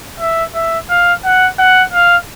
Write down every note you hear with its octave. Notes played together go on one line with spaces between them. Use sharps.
E5
E5
F5
F#5
F#5
F5